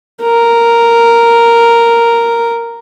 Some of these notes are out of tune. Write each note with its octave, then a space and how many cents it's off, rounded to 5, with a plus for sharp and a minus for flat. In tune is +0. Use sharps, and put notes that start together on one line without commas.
A#4 -5